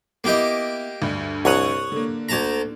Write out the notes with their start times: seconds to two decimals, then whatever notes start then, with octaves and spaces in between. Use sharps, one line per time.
0.24 A#3 B3 E4 G4 D#5
1.02 D2 G2
1.45 C2 C#5 F#5 D#6
1.92 D3 A#3
2.29 D2 A5 A#5